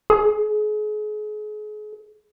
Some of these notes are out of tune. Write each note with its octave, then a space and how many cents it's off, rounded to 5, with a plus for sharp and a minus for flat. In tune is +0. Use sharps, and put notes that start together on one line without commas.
G#4 +35